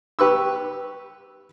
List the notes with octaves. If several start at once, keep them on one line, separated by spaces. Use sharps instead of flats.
G4 B4 C#6 E6